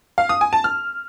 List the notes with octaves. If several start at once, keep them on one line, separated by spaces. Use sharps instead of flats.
F5
D#6
G#5
A5
F6